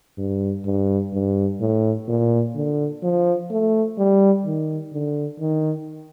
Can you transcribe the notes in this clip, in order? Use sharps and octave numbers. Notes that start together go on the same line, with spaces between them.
G2
G2
G2
A2
A#2
D3
F3
A3
G3
D#3
D3
D#3